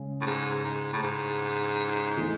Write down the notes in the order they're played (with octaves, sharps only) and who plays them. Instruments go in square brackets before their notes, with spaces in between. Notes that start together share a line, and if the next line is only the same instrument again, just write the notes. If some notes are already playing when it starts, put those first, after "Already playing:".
Already playing: [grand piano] C#3 G#3 C#4
[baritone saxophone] A2
G#2
G#2
A2
G#2
[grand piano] E3 A3 D#4